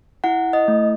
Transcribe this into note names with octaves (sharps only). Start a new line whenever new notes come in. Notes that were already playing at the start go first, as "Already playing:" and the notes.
E4 F#5
D#5
A3